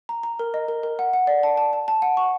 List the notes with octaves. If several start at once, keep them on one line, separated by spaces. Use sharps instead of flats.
A#5
A#5
A#4
D#5
A#4
A#4
F#5
F#5
D5
A5
A5
A5
A5
F#5
C#6